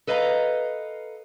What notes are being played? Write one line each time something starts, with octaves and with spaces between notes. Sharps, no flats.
A4 B4 D#5 F5 G#5 A#5